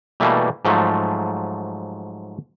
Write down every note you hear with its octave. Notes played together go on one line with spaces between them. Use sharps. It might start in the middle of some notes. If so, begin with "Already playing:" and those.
B2 E3 G3 A3 A#3
G#2 F3 F#3 A3